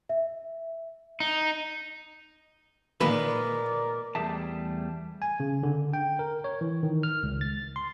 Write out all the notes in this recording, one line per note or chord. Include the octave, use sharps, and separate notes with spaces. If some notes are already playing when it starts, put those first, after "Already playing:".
E5
D#4
A#2 D#3 G#3 A#3 B3 A#4 B4 D5
E2 G3 A3 G#4 E5 A5
G#5
C#3
D3
G5
A#4
C#5
E3
D#3
F6
C#2
A6
C6